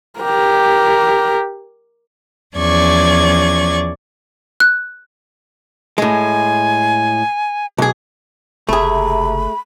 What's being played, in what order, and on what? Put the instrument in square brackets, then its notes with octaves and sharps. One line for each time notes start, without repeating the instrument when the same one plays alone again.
[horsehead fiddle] G4 A#4
[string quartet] E2 F3 C#4 D5 C#6 G#6
[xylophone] F#6
[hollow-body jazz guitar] A2 G#3 [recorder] G#5
[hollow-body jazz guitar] B1 G#4
[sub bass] F#1 [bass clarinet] C3 [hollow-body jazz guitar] A3 G#4 [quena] B5